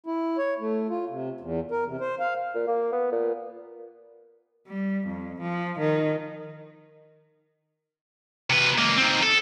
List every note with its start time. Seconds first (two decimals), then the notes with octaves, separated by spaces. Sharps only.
0.06 E4
0.38 C#5
0.60 A3
0.89 F4
1.09 C3
1.41 E2
1.71 A#4
1.87 C3
2.01 C5
2.19 F5
2.54 A#2
2.67 A#3
2.92 B3
3.12 A#2
4.68 G3
5.07 F2
5.42 F3
5.80 D#3
8.50 C3 B4
8.78 C#2 A#3
8.98 D#3 C4
9.23 A4